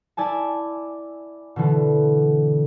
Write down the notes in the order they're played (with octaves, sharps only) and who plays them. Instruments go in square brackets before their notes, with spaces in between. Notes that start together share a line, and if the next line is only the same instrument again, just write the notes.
[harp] E4 D5 G#5 A5
B2 D3 E3